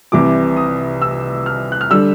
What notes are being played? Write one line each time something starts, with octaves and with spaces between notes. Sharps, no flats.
C2 C3 E3 G3 D6
D#6
E6
F6
F#6
F6
D3 G3 E6